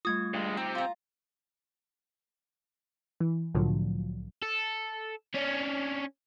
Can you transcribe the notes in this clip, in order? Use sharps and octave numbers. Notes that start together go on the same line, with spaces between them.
G3 A3 F4 D#6 G#6
G2 G#3
C4 D#4 G4
F4 A#5
E3
C2 A2 D3 F3 F#3
A4
C#4 D4